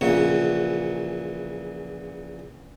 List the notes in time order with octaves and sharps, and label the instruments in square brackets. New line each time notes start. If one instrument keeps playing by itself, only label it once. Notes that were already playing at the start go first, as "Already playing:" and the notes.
[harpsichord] A#1 A#2 C#3 E3 F#4 F#5